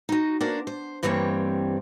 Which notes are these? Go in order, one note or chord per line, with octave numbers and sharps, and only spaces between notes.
D#4 F#4
A#3 D4 F#4 A#4 C5
C5
G2 E3 G3 A#3 C4 C#5